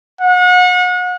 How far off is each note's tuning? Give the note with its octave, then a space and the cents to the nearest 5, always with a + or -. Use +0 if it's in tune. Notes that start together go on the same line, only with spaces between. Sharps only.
F#5 -35